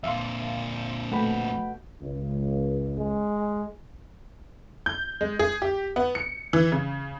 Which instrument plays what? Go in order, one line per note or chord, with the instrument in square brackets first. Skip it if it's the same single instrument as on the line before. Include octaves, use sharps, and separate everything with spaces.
[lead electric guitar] F2 A#2 [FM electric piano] E5 F5 C6
[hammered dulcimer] B2 G5 [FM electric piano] A3 B5
[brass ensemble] C#2
[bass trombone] G#3
[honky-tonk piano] G6
G#3
G#4
G4
B3
C#7
E3
C#3